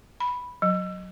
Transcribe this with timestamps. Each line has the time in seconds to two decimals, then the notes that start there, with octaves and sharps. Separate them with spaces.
0.20 B5
0.62 F#3